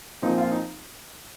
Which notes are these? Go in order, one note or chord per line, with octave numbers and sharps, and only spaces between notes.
A#2 F3 C4 D#4
F4
D#4